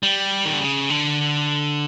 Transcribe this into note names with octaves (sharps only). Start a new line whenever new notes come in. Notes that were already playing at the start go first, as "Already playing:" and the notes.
G3
D#3
D3
C#3
D3